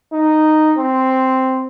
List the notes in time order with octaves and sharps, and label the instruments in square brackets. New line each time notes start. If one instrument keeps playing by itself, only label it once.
[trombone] D#4
C4